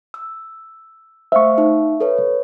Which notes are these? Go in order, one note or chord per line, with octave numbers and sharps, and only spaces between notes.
E6
A3 C5 E5 F5 C#6
D#4
A4 B4 C#5